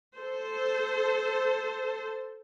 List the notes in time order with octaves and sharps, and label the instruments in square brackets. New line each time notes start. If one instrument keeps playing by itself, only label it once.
[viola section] A4 C5